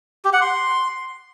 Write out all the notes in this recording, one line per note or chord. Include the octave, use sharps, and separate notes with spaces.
G4
F#5
C6